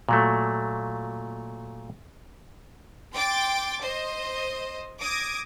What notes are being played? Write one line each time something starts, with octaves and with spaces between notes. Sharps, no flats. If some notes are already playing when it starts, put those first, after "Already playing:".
A#2 F#3 A3
G5 C6 D6 A6
C5 D#5
D6 D#6 G#6 A#6